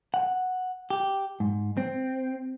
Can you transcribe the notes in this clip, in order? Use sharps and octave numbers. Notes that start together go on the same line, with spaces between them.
F#5
G4
G#2
C4